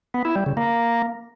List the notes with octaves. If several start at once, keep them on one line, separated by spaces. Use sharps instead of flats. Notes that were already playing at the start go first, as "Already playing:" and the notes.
B3
E4
G3
C#3
A#3